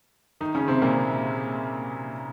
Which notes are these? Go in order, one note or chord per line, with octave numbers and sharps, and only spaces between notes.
D#3 D#4
C#3 C#4
C3 C4
A#2 A#3